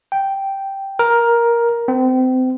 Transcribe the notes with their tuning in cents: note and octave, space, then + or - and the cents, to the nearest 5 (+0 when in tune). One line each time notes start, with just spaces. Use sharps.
G5 -5
A#4 +10
C4 -30